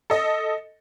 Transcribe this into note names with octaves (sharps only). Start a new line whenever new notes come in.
A4 D#5